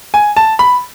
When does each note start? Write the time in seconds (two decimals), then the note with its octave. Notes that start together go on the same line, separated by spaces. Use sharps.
0.14 G#5
0.37 A5
0.59 B5